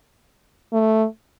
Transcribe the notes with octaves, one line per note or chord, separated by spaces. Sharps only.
A3